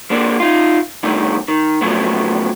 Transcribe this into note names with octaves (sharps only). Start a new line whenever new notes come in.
G#3 A#3 D4
D#4 F4
G2 D3 D#3 A3
D#3
A2 C#3 F3 F#3 A3 B3